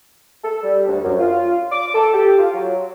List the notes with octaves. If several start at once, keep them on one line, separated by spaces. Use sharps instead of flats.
A4
G3
D2
F#2
F4
D6
A4
G4
F4
F#3